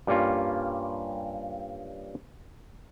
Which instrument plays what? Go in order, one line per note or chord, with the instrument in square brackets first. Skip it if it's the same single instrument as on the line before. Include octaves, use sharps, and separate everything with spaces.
[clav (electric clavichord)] G2 G3 A#3 C#4 F4